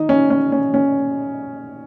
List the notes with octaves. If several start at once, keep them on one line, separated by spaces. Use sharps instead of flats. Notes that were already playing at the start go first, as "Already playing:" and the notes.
Already playing: D#3 D#4
C#4
C#4
C#4
C#4